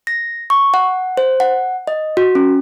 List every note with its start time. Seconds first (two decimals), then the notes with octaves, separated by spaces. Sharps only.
0.07 A#6
0.50 C#6
0.74 F#5
1.17 C5
1.40 F#5
1.87 D#5
2.17 F#4
2.35 C#4